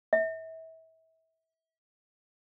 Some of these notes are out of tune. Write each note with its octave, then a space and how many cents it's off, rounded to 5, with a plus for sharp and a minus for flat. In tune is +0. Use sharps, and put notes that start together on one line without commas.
E5 -30